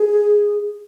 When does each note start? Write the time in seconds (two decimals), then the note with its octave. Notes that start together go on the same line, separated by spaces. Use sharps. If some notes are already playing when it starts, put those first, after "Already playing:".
Already playing: G#4